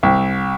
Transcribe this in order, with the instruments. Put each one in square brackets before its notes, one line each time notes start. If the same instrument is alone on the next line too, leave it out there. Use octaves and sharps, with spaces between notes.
[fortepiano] C2